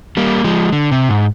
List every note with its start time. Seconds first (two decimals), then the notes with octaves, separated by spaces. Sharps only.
0.17 G3 A#3
0.44 F3 G#3
0.72 D3
0.91 C3
1.09 G#2